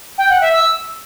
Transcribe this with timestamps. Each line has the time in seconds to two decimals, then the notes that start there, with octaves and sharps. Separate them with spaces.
0.18 G5
0.29 F#5
0.41 E5
0.52 E6